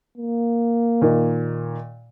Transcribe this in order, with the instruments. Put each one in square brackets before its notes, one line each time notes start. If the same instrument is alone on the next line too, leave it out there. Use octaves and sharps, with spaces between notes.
[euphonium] A#3
[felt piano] A#2 D#3